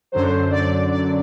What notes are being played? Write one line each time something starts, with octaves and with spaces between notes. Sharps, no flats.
F#2 D3 F#3 C5
D5
D5